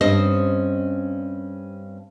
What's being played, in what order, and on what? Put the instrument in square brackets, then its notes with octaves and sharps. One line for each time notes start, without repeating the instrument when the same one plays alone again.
[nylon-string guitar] G2 C4 C#4 C5 D#5